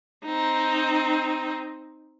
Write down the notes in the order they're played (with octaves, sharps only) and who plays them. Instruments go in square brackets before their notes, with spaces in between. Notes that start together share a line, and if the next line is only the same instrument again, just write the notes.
[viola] C4 D#4